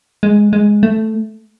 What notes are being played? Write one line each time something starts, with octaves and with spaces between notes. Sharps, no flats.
G#3
G#3
A3